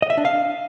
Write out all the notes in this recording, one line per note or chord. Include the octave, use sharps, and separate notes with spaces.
D#5
E5
D4
F5